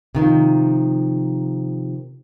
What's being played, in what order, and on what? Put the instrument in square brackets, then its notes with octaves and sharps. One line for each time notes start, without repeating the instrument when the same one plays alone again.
[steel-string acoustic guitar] C3 D#3 F3